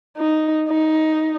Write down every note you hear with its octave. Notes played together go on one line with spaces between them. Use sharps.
D#4
D#4